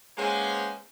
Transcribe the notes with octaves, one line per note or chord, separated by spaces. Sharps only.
G#3 A#3 B3 C#4 G#4 C5